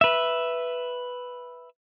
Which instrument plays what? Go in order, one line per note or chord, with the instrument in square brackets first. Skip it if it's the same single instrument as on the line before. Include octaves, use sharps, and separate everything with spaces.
[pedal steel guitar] B4 E5